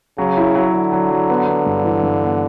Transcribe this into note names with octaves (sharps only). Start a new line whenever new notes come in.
C#3 F#3
E4
F#3
D3 F#3
F#3
F#3
B3
B3
G2
E3
G2
B3